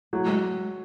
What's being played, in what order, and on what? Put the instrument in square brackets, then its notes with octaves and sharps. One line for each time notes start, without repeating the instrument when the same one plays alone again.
[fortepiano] F#3 [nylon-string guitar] A3
[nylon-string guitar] G#3